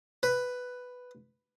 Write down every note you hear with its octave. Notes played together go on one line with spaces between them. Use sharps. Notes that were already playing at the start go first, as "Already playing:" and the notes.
B4